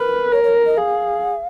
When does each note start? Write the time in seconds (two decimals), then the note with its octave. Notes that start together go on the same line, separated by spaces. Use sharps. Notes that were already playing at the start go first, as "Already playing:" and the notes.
Already playing: A#4 B4
0.32 A#4 C#5
0.44 C#5
0.66 D#5
0.77 G#4 F5